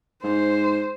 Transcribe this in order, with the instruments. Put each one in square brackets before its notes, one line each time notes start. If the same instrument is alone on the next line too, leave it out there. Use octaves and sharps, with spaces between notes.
[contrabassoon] G#2 [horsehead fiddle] C5